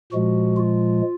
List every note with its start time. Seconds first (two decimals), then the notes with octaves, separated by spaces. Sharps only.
0.12 A#2 F3 G#3 F#4
0.57 F4